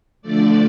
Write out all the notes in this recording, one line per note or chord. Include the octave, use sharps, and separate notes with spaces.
D3 F3 A3 D5